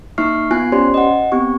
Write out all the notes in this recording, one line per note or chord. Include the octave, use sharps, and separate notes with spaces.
A#3 D#4 E5 C#6 F6 C7
B3 F4 G#5 F#6 C7
C#4 G4 C5 D5 C6
D#5 F#5
B3 C4 G4 C#6